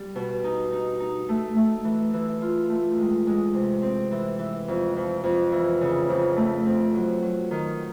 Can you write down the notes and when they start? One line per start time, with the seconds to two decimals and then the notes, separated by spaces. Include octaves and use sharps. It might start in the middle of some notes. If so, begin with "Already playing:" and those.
Already playing: G3
0.16 B2
0.44 D#4
0.72 D#4
1.00 D#4
1.29 A3
1.56 A3
1.84 E3
2.13 E3
2.42 F4
2.69 A3
2.98 G#3
3.27 G#3
3.54 C3
3.82 C4
4.11 E3
4.39 E3
4.68 F2
4.96 F2
5.24 F2
5.52 E3
5.81 C#3
6.09 F2
6.37 A3
6.66 C4
6.94 F#3
7.22 F#3
7.51 D#3